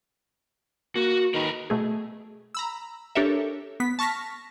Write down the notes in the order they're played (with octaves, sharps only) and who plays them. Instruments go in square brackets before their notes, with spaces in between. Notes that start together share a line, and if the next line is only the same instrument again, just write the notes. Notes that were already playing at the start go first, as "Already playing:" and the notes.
[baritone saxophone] A#3 [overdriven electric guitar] F#4
[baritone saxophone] D#3 [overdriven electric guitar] A#4 B4
[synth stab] B2 A3 G#4
A#5 B5 E6
D4 G4 A4 A#4 C#5 E5
B3 B6
A5 C#6 F6 A#6 B6